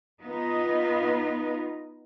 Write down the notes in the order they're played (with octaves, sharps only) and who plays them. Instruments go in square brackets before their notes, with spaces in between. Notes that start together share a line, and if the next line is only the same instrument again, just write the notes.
[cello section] B3 D#4 F4 D#5